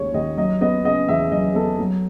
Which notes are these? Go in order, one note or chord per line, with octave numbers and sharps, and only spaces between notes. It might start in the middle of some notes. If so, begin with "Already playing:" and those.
Already playing: D#2 C#3 G#3 C#5
D#2 D#5
F#3 D#5
B3 D#5
C#3 D#5
E2 E5
F#3 D#5
B3 A4
F#3